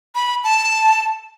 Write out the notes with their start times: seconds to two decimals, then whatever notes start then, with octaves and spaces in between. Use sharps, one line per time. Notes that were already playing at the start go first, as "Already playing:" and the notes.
0.15 B5
0.44 A5